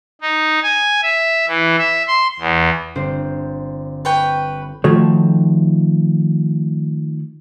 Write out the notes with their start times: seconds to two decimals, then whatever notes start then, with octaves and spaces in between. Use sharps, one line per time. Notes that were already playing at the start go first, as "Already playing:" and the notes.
0.21 D#4
0.63 G#5
1.03 E5
1.48 E3
1.78 E5
2.07 C6
2.39 E2
2.95 G1 C4 C5
4.05 B4 C#5 G5
4.84 D#3 F3 A3 F#4 C#5